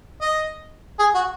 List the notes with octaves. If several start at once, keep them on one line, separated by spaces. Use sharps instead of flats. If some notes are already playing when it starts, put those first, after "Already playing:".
D#5
G#4
F#4